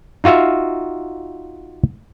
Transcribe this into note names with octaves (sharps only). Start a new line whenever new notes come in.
D#4 F4 F#4 E5 F5